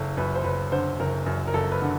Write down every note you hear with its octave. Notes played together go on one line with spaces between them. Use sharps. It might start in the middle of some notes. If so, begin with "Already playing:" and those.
Already playing: F#1 A4
F#2 B4
C5
F#1 B4
D3 C5
F#1 A#4
F#2
A#4
F#1 A4
B4
D3